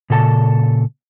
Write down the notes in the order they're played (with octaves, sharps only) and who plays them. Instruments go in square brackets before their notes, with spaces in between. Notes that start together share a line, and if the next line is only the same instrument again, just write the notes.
[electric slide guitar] A#2 C#3 A4 G#5 A5